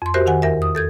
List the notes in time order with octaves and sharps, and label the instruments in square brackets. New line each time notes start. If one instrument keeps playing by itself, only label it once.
[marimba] F2 C6
F#4 G4 A#4 C5 E5
D#3 F#5 G#5
E2 A#4 E5
D#6
A4 G6 G#6